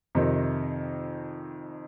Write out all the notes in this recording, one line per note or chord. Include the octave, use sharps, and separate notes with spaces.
F2 C3 D#3